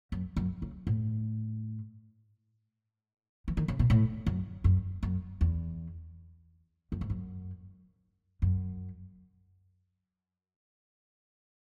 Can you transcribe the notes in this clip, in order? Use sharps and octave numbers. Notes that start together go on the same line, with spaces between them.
F#2
F#2
C#3
A2
E3
D#3
C#3
B2
A2
F#2
F#2
F#2
E2
F#2
G#2
F#2
F#2